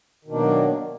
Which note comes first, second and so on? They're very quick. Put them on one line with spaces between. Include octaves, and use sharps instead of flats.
D#3 B2 D4 A#3 F#3